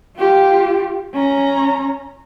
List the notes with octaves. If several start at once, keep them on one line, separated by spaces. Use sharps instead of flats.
F4 G4
C#4 A#5